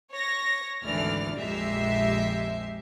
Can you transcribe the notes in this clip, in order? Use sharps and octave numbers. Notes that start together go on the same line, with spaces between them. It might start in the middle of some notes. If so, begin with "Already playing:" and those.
C#5 A#6
G#1 D2 E3 D5 F6
A#1 F2 G#3 G4 E5 C7